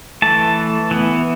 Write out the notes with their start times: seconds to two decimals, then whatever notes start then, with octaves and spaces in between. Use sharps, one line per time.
0.22 E3 A3 A5
0.91 E3 B3